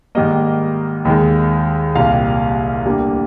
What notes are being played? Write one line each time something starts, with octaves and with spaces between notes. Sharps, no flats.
G#2 D#3 G3 A#3 D#5
D#2 D#3 G#3
C2 A#2 G3 F5
D2 D3 G3 A#3